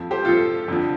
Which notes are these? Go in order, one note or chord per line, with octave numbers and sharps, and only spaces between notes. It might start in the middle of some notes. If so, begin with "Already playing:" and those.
Already playing: F2 F3
G4 C5
F2 F3 F4 A4
F2 D3 F3